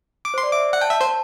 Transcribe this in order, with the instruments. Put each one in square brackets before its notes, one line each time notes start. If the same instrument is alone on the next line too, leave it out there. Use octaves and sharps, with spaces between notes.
[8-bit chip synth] D6
[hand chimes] C5 [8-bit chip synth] C6
[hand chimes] D5
[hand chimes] E5 [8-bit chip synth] D6
[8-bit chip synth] F#5
[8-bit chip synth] G5 [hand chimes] A5
[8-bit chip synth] E5
C5